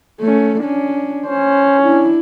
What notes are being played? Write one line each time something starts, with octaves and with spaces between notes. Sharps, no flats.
A3 C#4
C#4 D4
C#4 C5
D4 E4